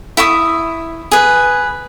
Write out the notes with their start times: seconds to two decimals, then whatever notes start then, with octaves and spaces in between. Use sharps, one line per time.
0.17 E4 E5 C#6 D#6
1.12 G#4 B4